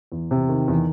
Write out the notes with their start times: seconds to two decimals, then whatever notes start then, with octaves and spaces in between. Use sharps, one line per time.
0.12 E2
0.31 C3
0.49 D#3
0.68 E2